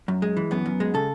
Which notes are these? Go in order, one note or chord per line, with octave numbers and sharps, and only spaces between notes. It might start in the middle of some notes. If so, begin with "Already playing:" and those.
F#2
G#3
E3
F#2 B3
F#2
G#3
C#3 A4